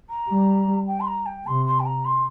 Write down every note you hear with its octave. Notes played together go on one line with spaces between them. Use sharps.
A#5
G3
G5
C6
A#5
G5
C3 C6
C6
G5
A#5
C6